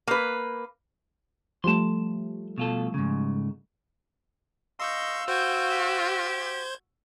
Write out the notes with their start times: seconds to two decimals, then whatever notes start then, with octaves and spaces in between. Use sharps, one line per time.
0.07 A#3 B4
1.64 F3 G3 A3 A5 C6
2.58 B2 F4 A4
2.94 G#2 C#3
4.80 D#5 F5 C6 C#6 E6 G6
5.28 F#4 C5 G5 G6 G#6
5.71 G4